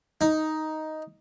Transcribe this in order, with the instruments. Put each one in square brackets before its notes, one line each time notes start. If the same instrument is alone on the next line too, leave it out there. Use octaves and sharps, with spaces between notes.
[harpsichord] D#4